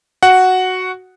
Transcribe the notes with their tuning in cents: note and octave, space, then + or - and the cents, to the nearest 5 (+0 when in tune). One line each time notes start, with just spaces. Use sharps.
F#4 +0 F#5 +0